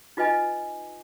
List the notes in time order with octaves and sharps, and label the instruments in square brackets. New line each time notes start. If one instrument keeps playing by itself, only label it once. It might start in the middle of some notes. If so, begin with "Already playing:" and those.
[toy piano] D#4 F4 B4 D#5 G#5